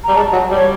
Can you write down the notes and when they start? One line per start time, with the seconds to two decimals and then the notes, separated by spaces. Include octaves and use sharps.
0.04 G3 A#5
0.15 G#3 A5
0.33 F#3
0.51 G3 C#5